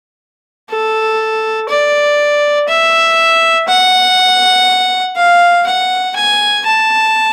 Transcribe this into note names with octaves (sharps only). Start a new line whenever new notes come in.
A4
D5
E5
F#5
F5
F#5
G#5
A5